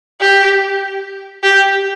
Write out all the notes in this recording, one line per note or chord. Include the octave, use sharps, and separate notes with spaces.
G4
G4